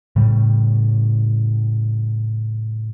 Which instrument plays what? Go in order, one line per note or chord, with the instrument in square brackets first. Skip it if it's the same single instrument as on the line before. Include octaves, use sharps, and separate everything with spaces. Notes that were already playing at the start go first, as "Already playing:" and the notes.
[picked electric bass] A2 C#3 G3